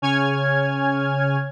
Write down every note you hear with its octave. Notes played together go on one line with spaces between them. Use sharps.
C#3 C#5 G#5 F6 G#6